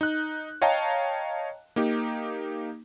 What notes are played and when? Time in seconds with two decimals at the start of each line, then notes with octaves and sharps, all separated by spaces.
0.01 D#4 F#6
0.62 C#5 D#5 F5 G5 A5 A#5
1.76 A#3 D#4 G4